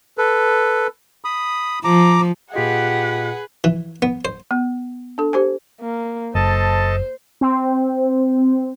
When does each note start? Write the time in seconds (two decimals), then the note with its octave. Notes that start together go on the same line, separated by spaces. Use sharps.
0.18 A4 B4
1.25 B5 D#6
1.84 F3 A#5 D6
2.54 A#2 F4 G4 G#4 B4 D#5 F#5
3.64 E3
4.02 B3
4.25 C5
4.51 B3
5.18 D4 A4
5.33 G4 C5 G#5
5.81 A#3
6.35 F#1 A4 C5 D#5 A5
7.41 C4